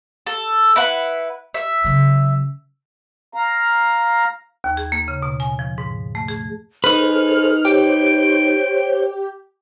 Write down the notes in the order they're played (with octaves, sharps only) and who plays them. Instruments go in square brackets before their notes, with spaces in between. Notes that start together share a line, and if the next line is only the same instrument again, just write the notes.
[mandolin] A4
E4 B4 F#5
E5
[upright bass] C#3 F#3
[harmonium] F5 A#5
[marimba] D#2
G#4
A#3
C#3
B2
G#5
F3
G#2
A3
G#4
[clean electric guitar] D#4 B4 [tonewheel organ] G#4 A4 C5 [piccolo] F6
[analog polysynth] G4 [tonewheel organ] C5 C#5 G6 [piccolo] D7